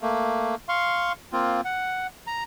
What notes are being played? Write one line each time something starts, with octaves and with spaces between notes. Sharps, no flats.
A3 A#3
F5 C6 C#6
A#3 C4 F4
F#5
A#5